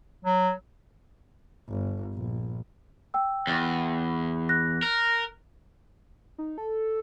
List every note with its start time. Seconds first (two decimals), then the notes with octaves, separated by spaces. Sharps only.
0.25 F#3
1.69 G1
2.14 A#1
3.14 G5 E6
3.47 E2
4.49 F#6 A#6
4.82 A#4
6.38 D#4
6.58 A4